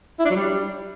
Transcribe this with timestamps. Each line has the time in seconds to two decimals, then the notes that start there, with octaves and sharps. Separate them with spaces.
0.19 E4
0.25 D4
0.30 F#3
0.36 G3